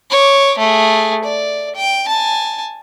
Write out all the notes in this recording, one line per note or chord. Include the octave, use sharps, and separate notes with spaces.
C#5 D6
A3 G#4
D5
G5
G#5 A5